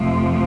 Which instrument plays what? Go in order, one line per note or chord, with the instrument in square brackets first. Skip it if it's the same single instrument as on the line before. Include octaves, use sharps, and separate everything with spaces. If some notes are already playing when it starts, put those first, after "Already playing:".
Already playing: [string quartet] F2 C3 F3 A3